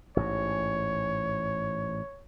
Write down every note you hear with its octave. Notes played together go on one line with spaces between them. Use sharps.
A1 G#2 C#5